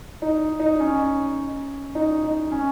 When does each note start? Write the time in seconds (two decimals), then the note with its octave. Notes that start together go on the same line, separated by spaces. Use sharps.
0.22 D#4
0.60 D#4
0.80 C#4
1.95 D#4
2.24 D#4
2.52 C#4